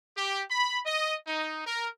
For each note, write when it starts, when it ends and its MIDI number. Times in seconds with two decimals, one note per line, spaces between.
0.17 0.43 67
0.51 0.80 83
0.86 1.16 75
1.27 1.64 63
1.66 1.88 70